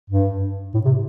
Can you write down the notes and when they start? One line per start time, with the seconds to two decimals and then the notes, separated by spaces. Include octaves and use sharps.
0.10 G2
0.74 A2
0.85 C3